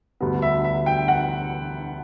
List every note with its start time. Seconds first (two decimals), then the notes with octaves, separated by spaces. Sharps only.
0.21 D2 D3 G3 B3
0.42 E5
0.64 E5
0.86 G5
1.08 F#5